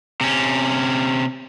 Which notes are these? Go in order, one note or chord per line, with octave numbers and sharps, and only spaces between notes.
C3 C#4